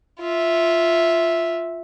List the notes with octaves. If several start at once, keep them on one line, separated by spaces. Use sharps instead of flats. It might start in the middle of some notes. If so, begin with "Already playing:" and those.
F4 E5